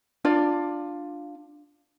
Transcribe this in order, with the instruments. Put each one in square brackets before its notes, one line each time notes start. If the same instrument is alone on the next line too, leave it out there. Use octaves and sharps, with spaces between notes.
[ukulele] D4 F4 D5